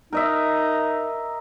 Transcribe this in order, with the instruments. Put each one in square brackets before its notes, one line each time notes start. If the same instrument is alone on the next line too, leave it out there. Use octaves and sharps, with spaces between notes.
[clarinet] D#4 [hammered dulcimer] A#4 D#5 E5